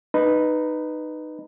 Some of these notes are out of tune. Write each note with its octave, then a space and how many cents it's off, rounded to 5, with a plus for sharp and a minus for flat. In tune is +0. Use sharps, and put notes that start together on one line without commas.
D#4 -15 B4 +0